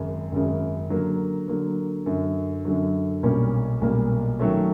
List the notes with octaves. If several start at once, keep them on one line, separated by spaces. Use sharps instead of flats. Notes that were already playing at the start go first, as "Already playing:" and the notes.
Already playing: G#1 F#2 C#3
G#1 F#2 C#3
D3 F#3 A#3
D3 F#3 A#3
F#2 D3 F#3
F#2 D3 F#3
B1 A#2 G3 A#3 C#4
B1 A#2 G3 A#3 C#4
D#3 F#3 A3 C#4